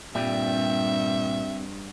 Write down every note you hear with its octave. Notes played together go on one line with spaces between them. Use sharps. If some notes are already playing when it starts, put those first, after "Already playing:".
G2 A#2 G3 C4 E5